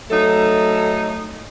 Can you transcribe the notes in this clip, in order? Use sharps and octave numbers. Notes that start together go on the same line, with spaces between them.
F#3 A3 D#4 A4